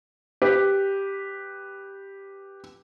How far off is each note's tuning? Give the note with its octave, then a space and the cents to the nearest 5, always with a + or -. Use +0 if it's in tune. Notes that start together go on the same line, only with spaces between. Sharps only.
G4 +0 B4 +0